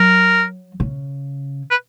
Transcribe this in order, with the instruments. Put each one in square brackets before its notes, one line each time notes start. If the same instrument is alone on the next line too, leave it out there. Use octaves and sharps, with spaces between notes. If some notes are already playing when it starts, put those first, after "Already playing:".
Already playing: [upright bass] F#3 [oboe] A#4
[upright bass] C#3
[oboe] B4